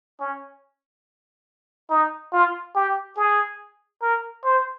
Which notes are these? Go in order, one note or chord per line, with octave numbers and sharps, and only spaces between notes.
C#4
D#4
F4
G4
G#4
A#4
C5